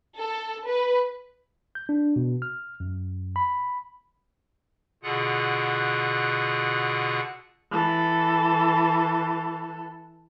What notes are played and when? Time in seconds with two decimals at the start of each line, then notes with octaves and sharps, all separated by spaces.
0.18 A4
0.68 B4
1.75 G6
1.89 D4
2.16 B2
2.42 F6
2.80 F#2
3.36 B5
5.03 B2 D3 F4 G#4 F#5 F#6
7.71 E3 A4